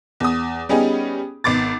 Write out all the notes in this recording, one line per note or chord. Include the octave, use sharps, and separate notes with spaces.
E2 D#6
G3 B3 C#4 D#4 G4 G#4
G#1 B3 D6 A6